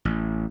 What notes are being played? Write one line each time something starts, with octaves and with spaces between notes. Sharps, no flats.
A1